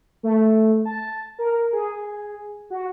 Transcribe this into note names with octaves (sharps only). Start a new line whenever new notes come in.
A3
A5
A#4
G#4
F#4